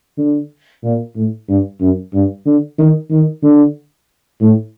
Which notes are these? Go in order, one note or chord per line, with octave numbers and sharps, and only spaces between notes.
D3
A#2
A2
G2
F#2
G2
D3
D#3
D#3
D3
A2